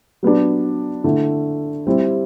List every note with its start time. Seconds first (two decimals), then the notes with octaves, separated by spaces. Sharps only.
0.23 F#3 B3 D4
1.04 D3 A3 E4
1.87 G3 C4 E4